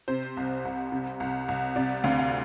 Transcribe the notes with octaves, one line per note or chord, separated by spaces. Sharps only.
C3 C5
C2
C2
C3
C2
C2
C3 D5
D2 F5
F5